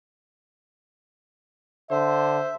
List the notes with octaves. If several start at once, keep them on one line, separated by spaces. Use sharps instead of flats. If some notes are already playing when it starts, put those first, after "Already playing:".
D3 C5 E5